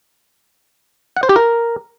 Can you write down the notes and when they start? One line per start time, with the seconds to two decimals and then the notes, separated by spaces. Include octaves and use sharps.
1.16 F#5
1.23 C5
1.29 G4
1.36 A#4